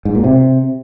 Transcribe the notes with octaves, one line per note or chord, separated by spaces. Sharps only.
G#2
A#2
C3